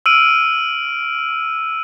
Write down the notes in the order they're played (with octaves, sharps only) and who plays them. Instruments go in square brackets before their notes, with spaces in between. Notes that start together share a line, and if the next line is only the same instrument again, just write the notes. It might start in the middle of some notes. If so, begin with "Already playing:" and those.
[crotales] E6 F6 D7 D#7